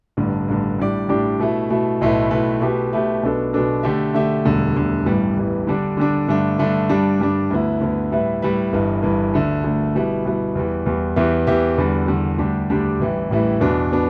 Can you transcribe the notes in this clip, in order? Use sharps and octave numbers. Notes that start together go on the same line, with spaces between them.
A1 G2 D3
A1 G2 D3
A2 G3 D4 G4 D5
A2 G3 D4 G4 D5
B2 A3 E4
B2 A3 E4
B1 A2 A3 E4 B4
B1 A2 A3 E4 B4
B2 A3 G4 B4 E5
B2 A3 G4 B4 E5
B1 B2 B3 D4 A4
B1 B2 B3 D4 A4
D3 A3 G4 E5
D3 A3 G4 E5
E1 D2 D3 G3
E1 D2 D3 G3
A1 G2 E3 G3
A1 G2 E3 G3
D3 G3 D4
D3 G3 D4
G2 D3 A3 D4
G2 D3 A3 D4
G2 G3 D4
G2 G3 D4
D2 D3 B3 E4
D2 D3 B3 E4
A2 G3 E4 B4 E5
A2 G3 E4 B4 E5
G1 G2 E3
G1 G2 E3
D2 D3 A3
D2 D3 A3
B2 G3 B3 E4
B2 G3 B3 E4
E2 E3 G3
E2 E3 G3
E2 E3 B3 G4 E5
E2 E3 B3 G4 E5
E2 D3 G3
E2 D3 G3
D2 D3 G3 D4 G4
D2 D3 G3 D4 G4
A1 A2 E3 G3 E4
A1 A2 E3 G3 E4
E2 B2 B3 D4
B2 B3 D4